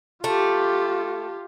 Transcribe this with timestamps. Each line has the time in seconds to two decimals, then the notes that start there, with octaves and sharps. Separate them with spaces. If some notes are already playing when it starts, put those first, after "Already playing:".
0.24 A3 F4 G4